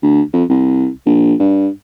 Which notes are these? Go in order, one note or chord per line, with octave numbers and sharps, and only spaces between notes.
D2
F2
C2
A#1
G2